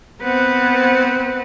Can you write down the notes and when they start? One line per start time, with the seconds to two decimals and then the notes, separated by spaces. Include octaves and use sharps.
0.22 B3 C4 B4 C5 F#5